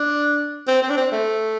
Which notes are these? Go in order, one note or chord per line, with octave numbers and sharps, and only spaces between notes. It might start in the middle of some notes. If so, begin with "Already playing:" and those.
Already playing: D4
C4
C4
D4
C4
A3